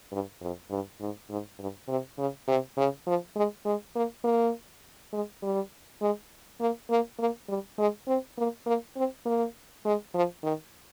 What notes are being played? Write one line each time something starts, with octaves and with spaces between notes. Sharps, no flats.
G2
F2
G2
G#2
G#2
G2
C3
C#3
C3
C#3
F3
G#3
G#3
A#3
A#3
G#3
G3
G#3
A#3
A#3
A#3
G3
G#3
C4
A#3
A#3
C4
A#3
G#3
F3
D#3